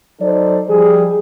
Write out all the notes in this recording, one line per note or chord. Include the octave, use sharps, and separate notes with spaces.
F#3 D#4 A4 C5 D5
F3 G3 G#4